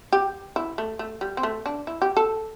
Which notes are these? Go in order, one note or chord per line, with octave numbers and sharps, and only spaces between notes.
G4
E4
A3
A3
G3
C4
A3
D4
E4
G4
A4